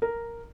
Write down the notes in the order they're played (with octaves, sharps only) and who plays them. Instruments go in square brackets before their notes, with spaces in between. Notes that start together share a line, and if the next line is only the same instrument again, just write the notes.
[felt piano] A#4